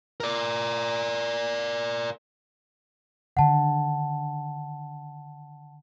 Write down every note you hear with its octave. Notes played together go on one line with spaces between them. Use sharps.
A#4 D5
D3 D#3 F#5 A5